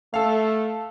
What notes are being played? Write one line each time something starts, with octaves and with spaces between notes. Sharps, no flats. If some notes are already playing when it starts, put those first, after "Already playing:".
A3 A4 F5